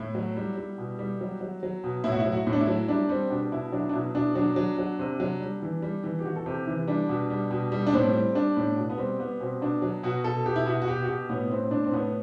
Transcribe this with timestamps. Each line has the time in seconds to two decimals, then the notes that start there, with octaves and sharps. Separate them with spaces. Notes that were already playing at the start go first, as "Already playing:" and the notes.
Already playing: A2 E4
0.15 F#3
0.37 G3
0.58 G3
0.78 B2
0.99 G3
1.21 F#3
1.41 F#3
1.63 F#3
1.84 B2
2.04 A2 E4
2.12 F#4
2.20 E4
2.26 F#3
2.32 F#4
2.47 A2
2.53 D4
2.61 E4
2.67 F#3
2.88 G3 D4
3.09 G3 C4
3.30 B2 D4
3.52 B2 E4
3.72 F#3 D4
3.89 D4
3.93 B2 E4
4.14 B2 D4
4.35 F#3 D4
4.56 F#3
4.78 F#3
4.99 C3
5.20 F#3
5.41 G3
5.62 E3
5.82 G3
6.04 E3
6.19 G4
6.24 E3 F#4
6.36 A4
6.46 C3 G4
6.67 E3 E4
6.87 G3 D4
7.09 B2
7.30 G3
7.51 B2
7.72 G3
7.86 D4
7.93 A2 C4
8.14 G3
8.35 G3 D4
8.57 A2
8.77 B2
8.90 B3
8.98 G3 C4
9.19 G3 B3
9.41 B2 C4
9.61 B2 D4
9.82 F#3
10.03 B2 F#4
10.24 B2 A4
10.46 B2 G4
10.56 E4
10.66 B2 F#4
10.82 F#4
10.88 B2 G4
11.03 F#4
11.08 B2 G4
11.29 A2 B3
11.50 A2 C4
11.71 A2 D4
11.84 C4
11.92 A2 B3